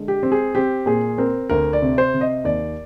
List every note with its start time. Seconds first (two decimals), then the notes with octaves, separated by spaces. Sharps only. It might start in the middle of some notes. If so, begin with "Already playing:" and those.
Already playing: D3 G#3
0.08 G4
0.23 C4
0.32 G#4
0.55 C4 G4
0.86 A#2 G#4
1.18 C4 A#4
1.50 D2 A#4
1.73 D5
1.82 C3
1.98 C5
2.14 C3
2.21 D#5
2.44 D#2 D5